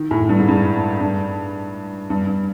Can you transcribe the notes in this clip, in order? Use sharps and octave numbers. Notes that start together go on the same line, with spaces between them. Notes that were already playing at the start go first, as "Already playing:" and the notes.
Already playing: D#3
A2
G2
G#2
G2
G2
G2
G2